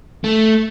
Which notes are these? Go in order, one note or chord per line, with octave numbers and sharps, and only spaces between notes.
A3